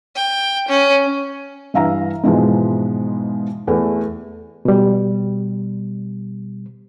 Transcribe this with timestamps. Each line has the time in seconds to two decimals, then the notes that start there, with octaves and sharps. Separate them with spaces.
0.16 G5
0.69 C#4
1.74 G2 E3 E5 F5 A#5
2.24 G#2 B2 E3 F3 G#3
3.67 E2 A3
4.65 B2 G3